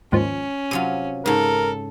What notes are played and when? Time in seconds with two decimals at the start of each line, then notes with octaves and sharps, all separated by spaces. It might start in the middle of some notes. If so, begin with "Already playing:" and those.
0.12 D#2 G#2 F3 C#4
0.71 C3 F#3 F4 D#7
1.26 G#2 C#3 A4 A#4